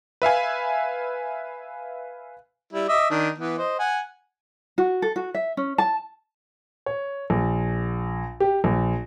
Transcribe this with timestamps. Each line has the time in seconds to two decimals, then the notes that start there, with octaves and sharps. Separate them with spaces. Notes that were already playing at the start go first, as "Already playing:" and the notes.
0.22 B4 E5 F5 G#5
2.73 G3 E4
2.88 D#5 E5 D6
3.10 D#3 D4
3.38 E3 B3
3.58 C5 D#5
3.79 F#5 G#5
4.78 F#4
5.02 A4
5.16 F#4
5.35 E5
5.57 C#4
5.78 A5
6.86 C#5
7.30 A#1
8.40 G4
8.64 A#1